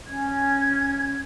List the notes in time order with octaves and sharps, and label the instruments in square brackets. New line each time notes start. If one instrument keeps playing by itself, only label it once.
[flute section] C#4 G#6